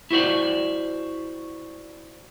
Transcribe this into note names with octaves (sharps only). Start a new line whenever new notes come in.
E4 F#4 C5 D5